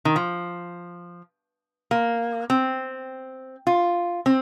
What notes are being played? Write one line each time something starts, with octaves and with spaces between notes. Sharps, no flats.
D#3
F3
A#3
C4
F4
C4